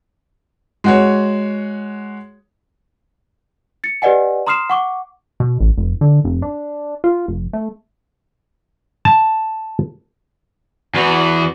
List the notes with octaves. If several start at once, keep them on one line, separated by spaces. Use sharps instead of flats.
G#3 F#4 C#5
A6 C#7
G4 B4 D5 D#5 F#5 G#5
A#5 C6 D#6 F6 C7 E7
F#5 C#6 D6
B2
A1
F1
D3
F1
D4
F4
F1
A3
A5
E2 E3 F#4